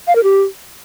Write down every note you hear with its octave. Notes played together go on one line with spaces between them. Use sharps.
F5
A#4
G4